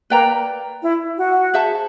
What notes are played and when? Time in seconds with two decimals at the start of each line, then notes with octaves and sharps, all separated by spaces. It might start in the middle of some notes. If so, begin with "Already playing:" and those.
0.10 A#3 B4 D5 G5 A#5
0.82 E4
1.18 F#4
1.54 G#4 C5 E5 A5